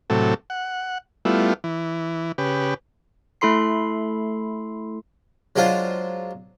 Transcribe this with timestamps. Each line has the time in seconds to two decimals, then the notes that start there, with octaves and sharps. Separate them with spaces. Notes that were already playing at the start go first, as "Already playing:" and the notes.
0.10 A2 C3 F#3 A4
0.50 F#5
1.25 G3 A3 B3 E4 F4
1.64 E3
2.38 C#3 G4 B4
3.41 A3 E4 A4 B5 C6 C7
5.56 F#3 G#3 D4 F4 C5